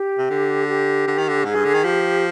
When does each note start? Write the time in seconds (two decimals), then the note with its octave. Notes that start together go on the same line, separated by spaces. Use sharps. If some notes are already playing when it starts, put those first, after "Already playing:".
Already playing: G4
0.18 C3
0.30 D3
0.68 G4
1.07 D3
1.18 D#3
1.29 D3
1.45 G#2 G#4
1.55 G2
1.65 D3
1.74 D#3
1.84 F3 G4